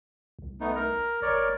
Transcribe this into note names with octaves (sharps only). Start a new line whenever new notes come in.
C2
A3 B3 D#4
A#4 A#5
G1 A#4 C#5 D5